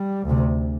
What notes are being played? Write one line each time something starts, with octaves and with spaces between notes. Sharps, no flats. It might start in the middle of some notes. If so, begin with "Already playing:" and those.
Already playing: G3
D2 C3